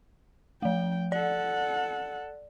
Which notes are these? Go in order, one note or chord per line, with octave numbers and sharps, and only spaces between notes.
F3 A3 G5
A4 D5 F#5